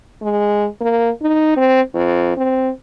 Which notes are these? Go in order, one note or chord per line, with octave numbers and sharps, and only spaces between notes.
G#3
A#3
D#4
C4
F2
C4